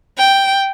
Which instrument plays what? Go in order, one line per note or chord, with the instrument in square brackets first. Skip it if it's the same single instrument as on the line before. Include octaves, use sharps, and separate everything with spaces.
[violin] G5